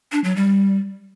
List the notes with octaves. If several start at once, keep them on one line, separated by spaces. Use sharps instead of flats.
D4
F#3
G3